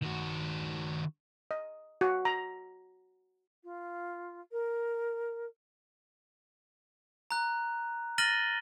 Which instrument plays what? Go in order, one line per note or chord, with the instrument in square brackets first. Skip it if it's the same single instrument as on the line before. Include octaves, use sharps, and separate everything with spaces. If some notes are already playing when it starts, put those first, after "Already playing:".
[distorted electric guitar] D#3 F#4
[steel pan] D#5
F#4
A#5
[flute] F4
A#4
[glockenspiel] A#5 F#6
F6 A6 A#6 D#7 F#7 G7